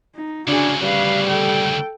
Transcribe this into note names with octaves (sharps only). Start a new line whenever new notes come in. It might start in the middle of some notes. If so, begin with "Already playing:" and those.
D#4
D2 C#3 D4 F#4 G#4
G3 B4 F5
A4 G5